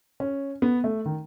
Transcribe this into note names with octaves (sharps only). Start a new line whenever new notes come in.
C#4
B3
A3
D#3